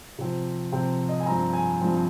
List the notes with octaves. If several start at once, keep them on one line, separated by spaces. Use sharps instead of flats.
C3 F3 C4
C3 F3 C4 G5
D#5
G#5
G2 F3 C4 A#5
G#5
G2 F3 C4